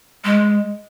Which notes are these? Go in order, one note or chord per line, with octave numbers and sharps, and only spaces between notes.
G#3